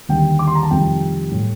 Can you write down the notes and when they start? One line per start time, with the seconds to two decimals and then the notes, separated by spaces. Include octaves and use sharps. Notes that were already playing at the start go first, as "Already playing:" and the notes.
0.09 D#2 D3 G3 G5
0.39 D6
0.47 C6
0.55 A#5
0.63 A5
0.71 F2 C3 D#3 G3 G5
1.31 A2 G3